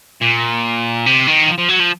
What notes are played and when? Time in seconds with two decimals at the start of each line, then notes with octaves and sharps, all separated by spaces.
0.21 A#2
1.06 C3
1.28 D#3
1.48 F3
1.59 F3
1.69 F#3
1.80 F3